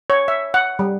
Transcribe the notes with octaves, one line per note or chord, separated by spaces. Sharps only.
C#5
E5
F#5
G3